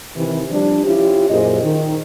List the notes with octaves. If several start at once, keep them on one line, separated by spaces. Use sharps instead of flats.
C3 D#3 E3
F3 G3 D4
C#4 E4 F4 G4
F#2 A#2 G#4 C5 D#5
D#3